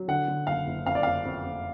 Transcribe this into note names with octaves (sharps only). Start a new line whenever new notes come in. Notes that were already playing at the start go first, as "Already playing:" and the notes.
Already playing: F#3
D3 F#5
D3
F#1 F5
F#1
F2 F5
D5
F2 F5
F2
F2